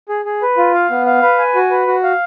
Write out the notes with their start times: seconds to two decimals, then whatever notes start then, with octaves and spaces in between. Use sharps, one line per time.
0.09 G#4
0.25 G#4
0.42 B4
0.57 F4
0.74 F5
0.91 B3
1.06 F5
1.22 B4
1.38 G#5
1.55 F#4
1.71 B4
1.87 F#4
2.03 F5